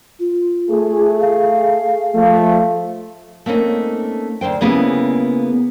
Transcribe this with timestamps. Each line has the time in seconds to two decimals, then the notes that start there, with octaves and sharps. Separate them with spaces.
0.20 F4
0.70 A3 G#4
1.21 F5
2.14 F3 A3
3.46 A3 A#3 C4 C#4 D#4
4.41 D2 B2 C5 G5
4.61 C#3 A#3 B3 E4 G4 G#4